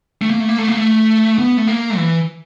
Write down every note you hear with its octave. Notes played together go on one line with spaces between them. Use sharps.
A3
A#3
A3
A#3
A3
A#3
A3
B3
A3
A#3
E3